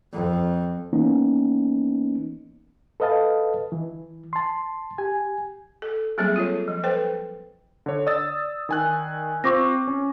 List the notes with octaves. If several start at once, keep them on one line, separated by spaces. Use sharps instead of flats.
F2
E3 A#3 B3 C#4 D#4
A4 B4 D#5 F5 A5
E3
A5 C6
G4 G#5
A4
F#3 G3 A#3 C4 G#4 E5
F4 A4 C#5
F3
A4 B4 C5 G5
D3 C#5
D5 D#6 E6 A6
D#3 G#5 F#6
C4 F4 C5 C#6 D6 A#6
C#4